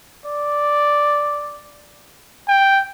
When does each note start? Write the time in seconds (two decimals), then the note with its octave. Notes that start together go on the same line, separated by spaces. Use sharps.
0.25 D5
2.48 G5